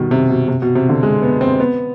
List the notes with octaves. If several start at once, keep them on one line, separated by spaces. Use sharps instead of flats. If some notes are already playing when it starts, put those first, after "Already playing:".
Already playing: B2 D#3 G3
C3
B2
C3
B2
C3
D3
G#3
B3
C4
B3